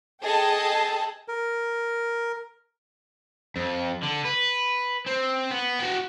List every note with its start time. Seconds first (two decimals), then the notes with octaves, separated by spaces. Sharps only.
0.23 G#4 A4 D#5 G5 A5
1.28 A#4
3.56 F2
4.03 D3
4.25 B4
5.06 C4
5.51 B3
5.81 F#4 G5